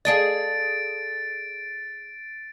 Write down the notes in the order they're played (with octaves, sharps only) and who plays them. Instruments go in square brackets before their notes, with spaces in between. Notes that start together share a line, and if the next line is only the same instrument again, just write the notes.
[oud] G#4 A4 D#5 [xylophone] D5 F5 [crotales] A6 D7